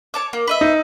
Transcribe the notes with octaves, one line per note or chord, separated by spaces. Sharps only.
C#5 A5 D6
A#3
B4 D#5 E5
D#4